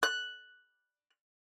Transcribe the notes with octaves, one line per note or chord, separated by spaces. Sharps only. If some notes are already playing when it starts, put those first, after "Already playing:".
F#6